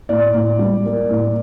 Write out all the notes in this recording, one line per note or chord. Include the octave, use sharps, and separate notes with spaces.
A2 D5
A2
G3
A#3
A2